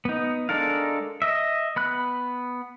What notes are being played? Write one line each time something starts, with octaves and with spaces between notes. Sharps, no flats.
B3 D#4
G#3 D4 A4 A#4 F5
D#5 E5
B3 B5 F#6